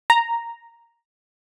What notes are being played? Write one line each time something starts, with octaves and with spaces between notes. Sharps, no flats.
A#5